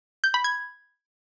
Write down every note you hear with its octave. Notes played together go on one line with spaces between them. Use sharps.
G6
B5
G#6